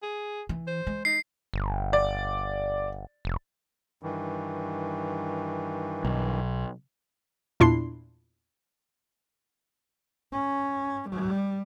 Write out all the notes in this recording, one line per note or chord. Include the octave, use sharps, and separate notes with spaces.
G#4
E3
C5
G#3
D#4 C7
G1
D5
F1
G2 D#3 E3
B1
E2 A#2 D4 E4 C6 C7
C#4
G3